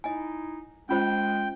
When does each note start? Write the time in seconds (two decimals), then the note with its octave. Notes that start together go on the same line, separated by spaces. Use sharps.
0.04 D#4 E4 D#5 G#5
0.89 G#3 C#4 F4 C5 G5